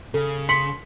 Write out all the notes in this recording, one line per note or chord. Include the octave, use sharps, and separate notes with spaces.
C#3 A4
C6 B6 C#7 F#7